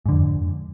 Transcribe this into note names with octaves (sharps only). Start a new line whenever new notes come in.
F2 G#2 D3